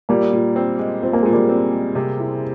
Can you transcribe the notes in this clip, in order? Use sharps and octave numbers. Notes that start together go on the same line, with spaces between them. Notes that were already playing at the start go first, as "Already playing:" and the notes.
A#2 G3 A#3
A#2
C4
G#3
A#2 C4
A#3
A#2 G#3
G3 A#3
C4
G#3
C3
E4